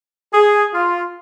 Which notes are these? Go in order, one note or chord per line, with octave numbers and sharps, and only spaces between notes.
G#4
F4